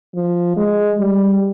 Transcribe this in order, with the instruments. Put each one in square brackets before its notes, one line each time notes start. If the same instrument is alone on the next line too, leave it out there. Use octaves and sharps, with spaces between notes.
[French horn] F3
G#3
G3